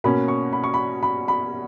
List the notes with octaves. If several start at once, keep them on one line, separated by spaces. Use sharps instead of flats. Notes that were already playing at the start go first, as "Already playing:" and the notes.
B2 A#3 C#4 B5
C#6
B5
C#6
B5
B5
B5